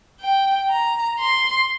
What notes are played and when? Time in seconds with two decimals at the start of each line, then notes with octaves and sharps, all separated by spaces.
0.20 G5
0.70 A#5
1.20 C6